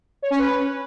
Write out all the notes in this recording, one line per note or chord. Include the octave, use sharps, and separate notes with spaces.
C#5
C#4
B4